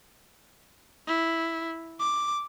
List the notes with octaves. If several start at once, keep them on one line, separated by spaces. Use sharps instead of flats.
E4
D6